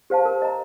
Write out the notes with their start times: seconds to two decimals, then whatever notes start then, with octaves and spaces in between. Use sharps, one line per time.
0.10 G4 C5 F5 A5
0.25 A#4
0.42 D#5 A#5